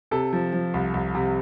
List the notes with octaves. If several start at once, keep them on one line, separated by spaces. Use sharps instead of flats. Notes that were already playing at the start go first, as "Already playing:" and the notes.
C3 A4
F3
F3
C2
C2
C3